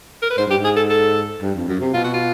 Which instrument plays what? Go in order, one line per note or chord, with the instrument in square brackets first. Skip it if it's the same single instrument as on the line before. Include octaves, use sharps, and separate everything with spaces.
[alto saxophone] A#4
B4
[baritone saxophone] G#2 [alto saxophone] C5
[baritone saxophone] G2 [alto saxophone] G4
[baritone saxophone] G#2
[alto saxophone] G#4
A4
A4
[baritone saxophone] G2
F2
F#2
C3
[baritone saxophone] B2 [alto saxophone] F4
[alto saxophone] F#4
F4